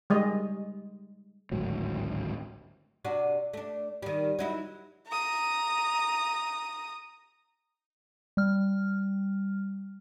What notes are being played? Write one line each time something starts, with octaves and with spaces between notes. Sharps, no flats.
G3 G#3 D#5
G#1 D2 A2 F#3
C3 D4 F#4
A3 D4
D#3 G3
F#3 D#4 E4
A#5 D#6
G3 F6